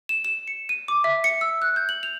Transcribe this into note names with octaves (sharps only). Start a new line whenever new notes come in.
E7
E7
C#7
D#7
D6
E5
C#7
E6
F#6
G6
F#7
F7